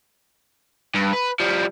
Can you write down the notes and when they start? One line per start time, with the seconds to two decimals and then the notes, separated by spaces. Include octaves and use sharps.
0.94 G2
1.13 B4
1.40 F3 G3